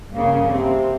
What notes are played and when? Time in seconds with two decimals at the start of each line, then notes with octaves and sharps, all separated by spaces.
0.13 G2 C#3 A#3
0.50 C3 C4